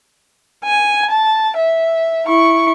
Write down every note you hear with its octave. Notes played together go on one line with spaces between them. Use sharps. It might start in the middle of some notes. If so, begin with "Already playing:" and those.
G#5
A5
E5
E4 C#6